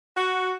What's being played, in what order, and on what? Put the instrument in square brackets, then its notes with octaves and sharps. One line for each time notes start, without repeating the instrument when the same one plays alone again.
[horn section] F#4